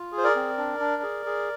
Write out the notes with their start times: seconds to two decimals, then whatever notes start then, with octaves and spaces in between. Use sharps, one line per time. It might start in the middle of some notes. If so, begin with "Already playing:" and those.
Already playing: F4
0.12 G#4
0.18 C5
0.24 A#4 D5
0.36 C4
0.58 D4
0.80 D4
1.02 G#4
1.26 G#4